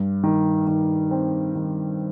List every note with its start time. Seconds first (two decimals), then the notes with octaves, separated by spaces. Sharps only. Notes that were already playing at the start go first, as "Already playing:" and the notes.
Already playing: G2
0.24 D#3
0.67 D#3
1.11 C4
1.55 D#3